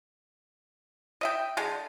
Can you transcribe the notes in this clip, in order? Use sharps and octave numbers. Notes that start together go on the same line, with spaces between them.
D#5 E5 G5
D3 G#3 D4